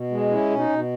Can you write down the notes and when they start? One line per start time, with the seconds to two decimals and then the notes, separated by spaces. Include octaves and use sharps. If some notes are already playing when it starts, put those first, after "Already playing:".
Already playing: B2
0.11 G#3
0.31 C#4 E4
0.50 B2
0.57 D#4
0.69 B2